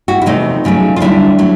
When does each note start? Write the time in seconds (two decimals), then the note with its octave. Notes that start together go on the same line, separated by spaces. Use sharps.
0.08 E4 F#4
0.22 E4
0.26 E2 C3 F3 A3 D#4 F4
0.64 E2 C#3 F#3 A3
0.96 F4
1.00 D#2 D3 G3 D4 E4
1.38 F#3 A3